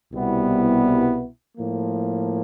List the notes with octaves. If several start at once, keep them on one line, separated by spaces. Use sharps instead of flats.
C2 B2 G3 B3 E4
A2 F3 A#3